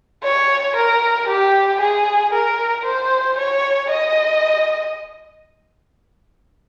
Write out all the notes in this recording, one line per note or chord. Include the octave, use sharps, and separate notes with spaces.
C#5
A#4
G4
G#4
A#4
C5
C#5
D#5